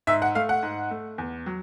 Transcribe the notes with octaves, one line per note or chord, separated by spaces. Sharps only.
G#2 E5
F#5
A3 F5
F#5
G#2
A3
E2
F#3